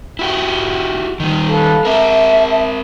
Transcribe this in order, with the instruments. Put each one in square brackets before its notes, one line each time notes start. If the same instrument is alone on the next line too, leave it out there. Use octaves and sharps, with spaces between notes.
[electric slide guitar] E4 F#4 G4
D#3 G3
[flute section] A4 B4 F5
[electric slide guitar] C4 A#4 [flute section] E5 A5